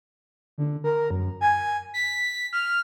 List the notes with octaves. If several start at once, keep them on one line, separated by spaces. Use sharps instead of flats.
D3
A#4
F#2
G#5
B6
F6